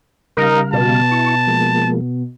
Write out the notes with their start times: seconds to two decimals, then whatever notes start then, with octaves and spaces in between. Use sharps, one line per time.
0.37 C#3 G3 D#4 A#4 F5
0.73 B2 A5
1.11 E4 C#6
1.47 F3 G#3 A#3